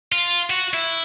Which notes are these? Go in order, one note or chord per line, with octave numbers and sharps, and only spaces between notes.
F4
F#4
E4